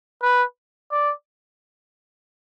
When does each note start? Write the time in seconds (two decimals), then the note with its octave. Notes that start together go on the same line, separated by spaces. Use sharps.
0.23 B4
0.92 D5